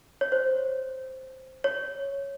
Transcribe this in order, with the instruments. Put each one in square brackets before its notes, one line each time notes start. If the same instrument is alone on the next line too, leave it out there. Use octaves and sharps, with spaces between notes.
[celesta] C#5
C5
C#5